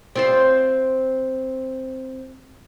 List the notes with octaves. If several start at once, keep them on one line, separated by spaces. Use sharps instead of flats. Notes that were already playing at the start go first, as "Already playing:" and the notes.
C4 F4 C5